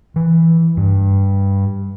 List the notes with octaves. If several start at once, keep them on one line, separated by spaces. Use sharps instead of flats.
E3
G2